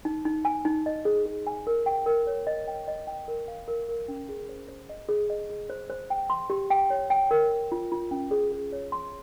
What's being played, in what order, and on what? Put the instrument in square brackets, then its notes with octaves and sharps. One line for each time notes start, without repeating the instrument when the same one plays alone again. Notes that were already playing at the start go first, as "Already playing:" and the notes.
[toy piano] D#4
D#4
G#5
D#4
D#5
G#4
G#4
G#5
A#4
G5
A#4
C#5
D#5
G5
D#5
G5
A#4
F5
A#4
A#4
C#4
G#4
C5
C5
D#5
G#4
D#5
G#4
C5
C5
G5
C6
G4
G5
C#5
G5
A#4
A#4
F4
F4
C#4
G#4
G#4
C#5
C6